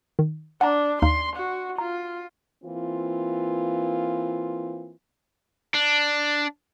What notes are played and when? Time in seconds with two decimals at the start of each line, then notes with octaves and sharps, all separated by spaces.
0.19 D#3
0.61 D4 F#5 A5 A#5
1.02 D#2 D#4 F5 C6
1.36 F#4
1.78 F4 A#5
2.63 E3 A#3 C4 F4
5.74 D4